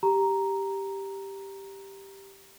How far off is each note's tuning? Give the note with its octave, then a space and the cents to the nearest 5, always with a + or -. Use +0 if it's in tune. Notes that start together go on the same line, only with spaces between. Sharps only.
G4 +0 A#5 +0